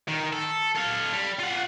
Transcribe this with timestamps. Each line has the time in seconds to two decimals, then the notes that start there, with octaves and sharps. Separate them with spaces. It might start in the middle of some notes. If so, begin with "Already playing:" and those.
0.08 D#3
0.33 A4
0.76 A4 F5
1.13 G3
1.39 F4 F#5